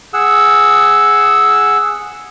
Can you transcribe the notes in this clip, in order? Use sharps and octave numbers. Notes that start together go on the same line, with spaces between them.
G#4 F#5 E6